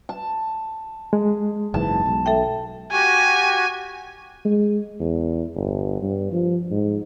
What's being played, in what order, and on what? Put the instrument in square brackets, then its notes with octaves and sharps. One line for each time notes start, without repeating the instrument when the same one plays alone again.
[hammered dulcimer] A5
[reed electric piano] G#3
[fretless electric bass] F#1 G#2 E3 [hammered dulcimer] A5
[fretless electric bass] B1
[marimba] A4 E5 G5
[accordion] F#4 G4 [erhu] G#5
[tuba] G#3
E2
G1
G2
F3
G#2